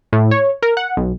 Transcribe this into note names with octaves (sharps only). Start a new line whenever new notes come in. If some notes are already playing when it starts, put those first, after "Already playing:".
A2
C#5
A#4
F#5
B1